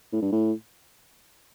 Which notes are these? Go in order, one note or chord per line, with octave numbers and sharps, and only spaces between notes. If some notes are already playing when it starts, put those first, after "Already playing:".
A2
G2
A2